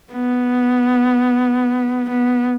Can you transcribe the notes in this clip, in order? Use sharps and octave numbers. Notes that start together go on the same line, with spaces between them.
B3
B3